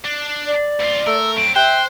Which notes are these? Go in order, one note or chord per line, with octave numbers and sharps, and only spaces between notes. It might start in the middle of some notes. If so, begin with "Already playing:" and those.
D4
D5
D2 F4
A3 A#4 E6
F#3 C4 D7
C5 E5 G5 F#6